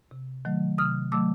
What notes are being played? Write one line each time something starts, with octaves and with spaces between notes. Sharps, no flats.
C3
D#3 F#3 A3
C3 D#6 F6
D#3 F#3 A3 D6 E6